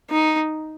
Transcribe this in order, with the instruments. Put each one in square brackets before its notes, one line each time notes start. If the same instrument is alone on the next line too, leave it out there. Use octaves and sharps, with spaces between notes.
[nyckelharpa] D#4